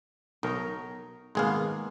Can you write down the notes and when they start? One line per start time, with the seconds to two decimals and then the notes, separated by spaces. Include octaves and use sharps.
0.43 B1 D#4 A#4 C#5
1.35 G#1 G#3 A#3 B3 G#4 F5